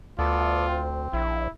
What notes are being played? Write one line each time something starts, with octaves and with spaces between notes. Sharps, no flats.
D2 B3 F4 A4 D5
C4
A#1 E4